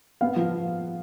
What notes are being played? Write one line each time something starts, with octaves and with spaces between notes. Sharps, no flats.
B3 F5
F3